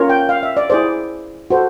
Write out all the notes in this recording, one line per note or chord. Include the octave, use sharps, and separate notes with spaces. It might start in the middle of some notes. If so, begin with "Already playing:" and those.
Already playing: C#4 F4 A#4 C#5
G5
F5
E5
D5
E4 G#4 C5 D5
F#4 A4 C5